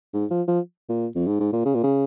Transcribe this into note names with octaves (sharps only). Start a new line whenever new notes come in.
G#2
F3
F3
A#2
F2
G#2
G#2
A#2
C#3
A#2
C#3